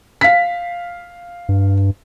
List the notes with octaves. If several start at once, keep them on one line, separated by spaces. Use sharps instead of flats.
F5 B6
G2